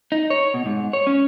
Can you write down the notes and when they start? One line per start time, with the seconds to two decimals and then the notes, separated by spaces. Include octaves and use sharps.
0.12 D#4
0.30 C#5
0.54 B2
0.66 G#2
0.93 C#5
1.07 C#4